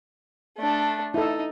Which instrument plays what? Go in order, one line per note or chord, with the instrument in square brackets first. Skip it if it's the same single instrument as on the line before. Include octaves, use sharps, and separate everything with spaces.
[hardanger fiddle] A3 D4
[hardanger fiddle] D#4 [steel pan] E4 A4